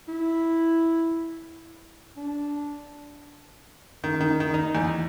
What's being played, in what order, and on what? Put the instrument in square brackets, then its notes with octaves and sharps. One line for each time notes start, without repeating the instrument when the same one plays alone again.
[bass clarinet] E4
D4
[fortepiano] D#3
D#3
D#3
D#4
E2